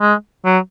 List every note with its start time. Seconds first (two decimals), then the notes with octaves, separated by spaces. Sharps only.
0.01 G#3
0.45 F#3